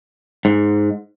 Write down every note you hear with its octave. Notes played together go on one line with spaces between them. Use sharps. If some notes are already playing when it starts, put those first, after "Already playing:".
G#2